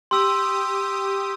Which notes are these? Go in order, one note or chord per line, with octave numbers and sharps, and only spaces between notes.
G4 C6 D#6 E6